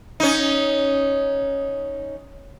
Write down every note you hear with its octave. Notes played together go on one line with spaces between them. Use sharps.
C#4 D#4